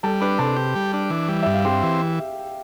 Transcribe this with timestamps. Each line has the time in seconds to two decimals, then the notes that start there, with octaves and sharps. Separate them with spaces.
0.03 G3 A4 A5
0.21 D4 B4 B5
0.38 C3 A4 A5
0.56 G4
0.75 G3
0.93 D4
1.10 E3
1.28 G3
1.43 G2 E5
1.54 F5
1.65 C4 G4 G5
1.83 E3